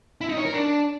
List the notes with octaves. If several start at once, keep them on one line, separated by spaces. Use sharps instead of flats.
E4
D#4
C#5
A#4
D4